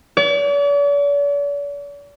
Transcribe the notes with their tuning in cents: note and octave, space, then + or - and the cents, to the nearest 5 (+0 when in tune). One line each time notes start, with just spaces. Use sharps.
D5 -45